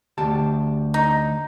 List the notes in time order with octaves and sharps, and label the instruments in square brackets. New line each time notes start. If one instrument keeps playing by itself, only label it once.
[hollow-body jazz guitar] D2 G4 A5
[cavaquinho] D#4